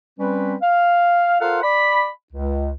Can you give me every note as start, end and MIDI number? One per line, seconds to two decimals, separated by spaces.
0.19 0.55 55
0.19 0.55 60
0.19 0.55 61
0.19 0.55 71
0.61 1.36 77
1.41 1.61 65
1.41 1.61 69
1.41 1.61 70
1.41 1.61 72
1.41 1.61 77
1.41 1.61 78
1.63 2.08 74
1.63 2.08 83
2.33 2.71 37